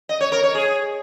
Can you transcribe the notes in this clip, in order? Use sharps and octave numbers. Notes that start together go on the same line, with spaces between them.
D#5
C#5
A#4
C#5
G#4